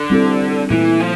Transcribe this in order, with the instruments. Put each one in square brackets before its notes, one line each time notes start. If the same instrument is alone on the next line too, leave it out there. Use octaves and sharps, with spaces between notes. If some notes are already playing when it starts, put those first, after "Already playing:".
Already playing: [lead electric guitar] D3
[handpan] G3 C4 E4 A4
[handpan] A#2 A3 E4 [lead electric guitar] E3
[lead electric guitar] F3